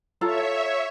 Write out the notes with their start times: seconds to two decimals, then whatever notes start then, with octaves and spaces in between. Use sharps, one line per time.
0.21 F4 A4 C#5 E5 A#5